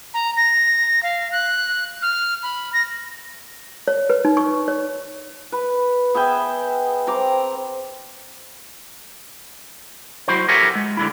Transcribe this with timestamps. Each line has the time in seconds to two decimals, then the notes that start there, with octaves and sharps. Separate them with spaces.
0.14 A#5
0.37 A#6
1.03 F5
1.32 F#6
2.02 F6
2.43 B5
2.73 A#6
3.88 C#5
4.10 B4
4.25 D#4
4.37 C#6
4.68 C#5
5.52 B4
6.14 B3 G#4 E5 G5
7.07 C4 A#5 D6
10.28 F#3 E4 F#4 C5
10.48 G4 A4 A#4 E5 F#5 G#5
10.75 G#3
10.97 D3 G#3 E4